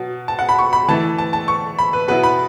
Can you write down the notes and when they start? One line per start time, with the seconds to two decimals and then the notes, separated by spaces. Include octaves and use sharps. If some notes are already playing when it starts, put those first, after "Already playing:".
Already playing: B2 F#3 B3
0.28 A5
0.39 F#5
0.49 B5
0.59 C#6
0.73 B5
0.88 E3 A3 E4 A5
1.18 A5
1.33 A5
1.48 C#6
1.79 B5
1.93 B4
2.08 B2 F#3 B3 E4 B4
2.23 B5